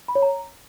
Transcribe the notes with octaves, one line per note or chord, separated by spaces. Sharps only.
B5
C#5
A#5